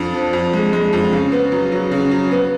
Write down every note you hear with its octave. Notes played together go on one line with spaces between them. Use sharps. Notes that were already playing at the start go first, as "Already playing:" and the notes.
Already playing: F2 D4
F3
F2
G#3
G#3
F2
C#3
B3
F#3
F#3
C#3
F#3
B3